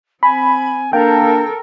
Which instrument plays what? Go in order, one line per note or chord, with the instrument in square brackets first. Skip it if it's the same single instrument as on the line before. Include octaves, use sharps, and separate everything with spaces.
[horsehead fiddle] C4 [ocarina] G#5 [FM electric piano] B5
[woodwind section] A#3 D4 [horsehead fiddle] A4 A#4 [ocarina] F5 [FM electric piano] G5